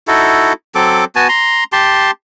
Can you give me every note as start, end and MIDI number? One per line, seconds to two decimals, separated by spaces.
0.08 0.53 63
0.08 0.53 64
0.08 0.53 66
0.08 0.53 69
0.75 1.05 54
0.75 1.05 60
0.75 1.05 69
0.75 1.05 86
1.16 1.28 59
1.16 1.28 66
1.16 1.28 80
1.16 1.28 81
1.29 1.64 82
1.29 1.64 84
1.72 2.11 67
1.72 2.11 81
1.72 2.11 84